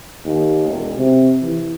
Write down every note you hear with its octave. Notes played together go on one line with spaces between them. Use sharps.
D#2
E1
C3
E3